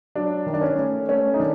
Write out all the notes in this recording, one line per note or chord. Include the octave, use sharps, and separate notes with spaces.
F#3 D4
D#3
D4
C#4
A3
A3 C#4
D#4
D#3 D4